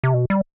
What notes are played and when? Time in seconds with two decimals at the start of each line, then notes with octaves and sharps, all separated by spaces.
0.04 C3
0.14 B2
0.30 G3